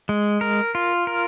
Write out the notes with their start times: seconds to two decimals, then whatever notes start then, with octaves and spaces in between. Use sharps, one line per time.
0.09 G#3
0.41 A#4
0.75 F4
1.07 A#4